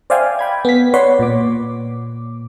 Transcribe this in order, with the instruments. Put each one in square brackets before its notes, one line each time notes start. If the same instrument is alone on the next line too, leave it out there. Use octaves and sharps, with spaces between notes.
[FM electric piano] C5 D5 E5 F5 G5 G#5
G5 B5 G#6
B3 B6
B4 C#5 D5 F#5 C6
A#2 D6